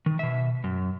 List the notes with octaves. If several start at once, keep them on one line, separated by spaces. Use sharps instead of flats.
D#3
B2 E5
F#2